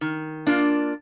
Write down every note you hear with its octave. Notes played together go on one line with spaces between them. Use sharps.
D#3
A#3 D4 F4